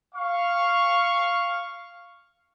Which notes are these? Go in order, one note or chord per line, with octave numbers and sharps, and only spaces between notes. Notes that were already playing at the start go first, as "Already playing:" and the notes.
F5 C#6